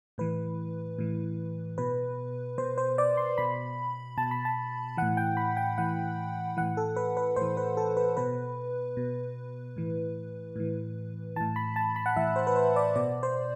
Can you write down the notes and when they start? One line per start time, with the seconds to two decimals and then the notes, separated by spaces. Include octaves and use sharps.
0.18 A2 E3 B4
0.99 A2 E3
1.78 B2 B4
2.58 B2 C5
2.78 C5
2.98 D5
3.17 C6
3.38 B2 B5
4.17 B2 A5
4.31 B5
4.45 A5
4.97 A2 E3 F#5
5.17 G5
5.37 B5
5.57 G5
5.78 A2 E3 F#5
6.57 A2 E3 F#5
6.77 A4
6.96 B4
7.17 B4
7.36 A2 E3 C5
7.57 B4
7.77 A4
7.97 B4
8.17 B2 B4
8.97 B2
9.77 A2 E3
10.56 A2 E3
11.36 A2 E3 A5
11.56 B5
11.76 A5
11.96 B5
12.06 F#5
12.16 A2 E3 E5
12.36 C5
12.47 B4
12.56 C5
12.76 D5
12.96 B2 D5
13.23 C5